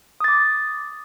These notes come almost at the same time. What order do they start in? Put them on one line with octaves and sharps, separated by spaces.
D#6 A6 D6